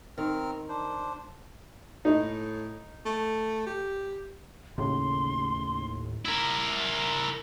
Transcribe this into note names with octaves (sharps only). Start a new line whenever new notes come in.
D#3 C4 A#4 F6
D4 C5
A2 D#4
A3
G4
D#2 A2 C#3 C6
E4 A#4